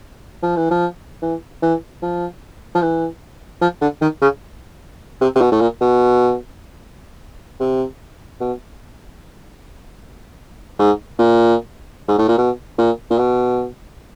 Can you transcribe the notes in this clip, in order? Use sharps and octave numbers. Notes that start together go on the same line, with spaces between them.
F3
E3
F3
E3
E3
F3
F3
E3
F3
D3
D#3
C#3
C3
C3
B2
A2
A#2
B2
C3
B2
G#2
A#2
G#2
A2
A#2
B2
A#2
A#2
B2